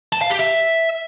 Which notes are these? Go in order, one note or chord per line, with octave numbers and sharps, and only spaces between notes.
A5
F5
G4
E5